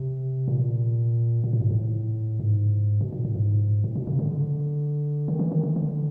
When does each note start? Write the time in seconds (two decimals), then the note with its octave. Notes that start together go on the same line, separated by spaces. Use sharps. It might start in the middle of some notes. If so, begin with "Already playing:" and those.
Already playing: C3
0.48 A#2
1.44 A#2
1.53 A2
1.61 G#2
1.70 A2
2.40 G#2
3.01 B2
3.13 A#2
3.25 A2
3.35 G#2
3.84 A2
3.96 B2
4.07 C#3
4.19 D3
5.28 D#3
5.39 E3
5.52 D#3
5.63 D3
5.76 D3